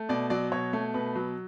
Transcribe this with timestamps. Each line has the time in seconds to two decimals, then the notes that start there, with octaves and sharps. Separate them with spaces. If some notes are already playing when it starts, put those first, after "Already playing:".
Already playing: A3
0.09 B2 D5
0.30 F#3 D5
0.52 B2 C#5
0.73 A3
0.94 B2 B4
1.15 F#3